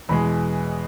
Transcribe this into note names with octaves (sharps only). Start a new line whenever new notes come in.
E2 B2 G#3 B5